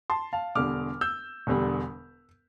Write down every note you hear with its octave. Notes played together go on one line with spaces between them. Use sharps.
A5 C6
F5 A5
E1 E2 D3 G3 D6 F6
E6 G6
E1 E2 D3 G3